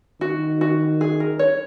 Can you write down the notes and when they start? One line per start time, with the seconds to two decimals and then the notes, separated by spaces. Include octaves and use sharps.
0.21 D#3 F#4
0.61 F#4
1.01 G#4
1.20 A#4
1.39 C#5